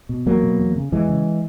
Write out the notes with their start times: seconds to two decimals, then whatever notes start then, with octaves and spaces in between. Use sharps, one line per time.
0.09 B2
0.26 E2 F#3 A#3
0.43 B2
0.59 E2
0.76 C#3
0.92 E2 E3 G#3
1.09 C#3